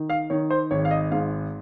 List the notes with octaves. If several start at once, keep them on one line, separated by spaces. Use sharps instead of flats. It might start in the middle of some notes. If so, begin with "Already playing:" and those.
Already playing: D#3
F5
D#3 C#5
C5
G#1 C#5
F5
D#5
G#2 F5